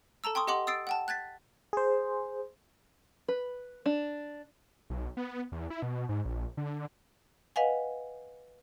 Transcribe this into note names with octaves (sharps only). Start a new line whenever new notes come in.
A4 A5 A#5 E6
G5 C6 C#6 D#6
G4 D#5 F#5 C6 D6 F#7
D#6 E6 A6 C7 D7
F#5 G5 A5
F#6 G#6 A6 B6
G#4 C5
B4
D4
B1
B3
E2
E4
B2
G#2
A#1
D3
B4 D#5 F5 F#5 G#5